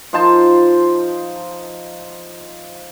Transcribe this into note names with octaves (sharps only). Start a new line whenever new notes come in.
F3 D#4 C5 A5